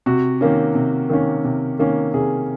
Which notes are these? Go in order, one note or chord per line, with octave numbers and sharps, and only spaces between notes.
C3 F#4
D#3 A#3 C#4
C3
D#3 A#3 C#4
C3
D#3 A#3 C#4
C3 G#4